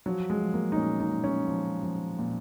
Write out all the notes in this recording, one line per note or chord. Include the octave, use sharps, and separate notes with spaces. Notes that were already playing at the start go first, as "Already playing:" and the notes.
F3 F#3
G#3
F3
A#3
D#4
A#2 C#4
D#4
A#2
C#4
F3
F3
A#2